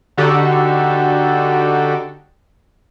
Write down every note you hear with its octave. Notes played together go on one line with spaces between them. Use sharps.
D3 D4 D#4 F#4 G4 A4